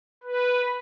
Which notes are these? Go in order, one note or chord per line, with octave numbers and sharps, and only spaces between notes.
B4